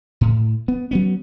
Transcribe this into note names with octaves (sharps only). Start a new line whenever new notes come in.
A2
B3
F#3 B3 C#4